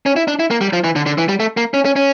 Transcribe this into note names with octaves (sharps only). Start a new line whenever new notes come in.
C#4
E4
D4
E4
A#3
G3
F3
E3
D3
D3
E3
G3
A3
A#3
C#4
C#4
C#4